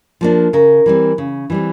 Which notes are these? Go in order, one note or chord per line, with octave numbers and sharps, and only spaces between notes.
F3 A#3 D4
C#3 A#4
E3 G3 C4
C#3
E3 G3 C4